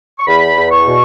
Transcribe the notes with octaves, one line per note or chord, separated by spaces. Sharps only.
C#6
E2 B5
E2
C#6
B2